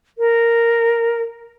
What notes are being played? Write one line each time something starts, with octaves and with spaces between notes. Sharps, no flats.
A#4